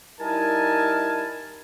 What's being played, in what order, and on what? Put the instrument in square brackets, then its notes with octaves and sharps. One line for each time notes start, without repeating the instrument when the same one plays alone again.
[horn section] G3 D#4 E4 A#4 G#5 A5